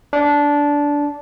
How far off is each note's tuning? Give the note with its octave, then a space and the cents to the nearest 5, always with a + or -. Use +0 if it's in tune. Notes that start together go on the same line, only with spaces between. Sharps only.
D4 -15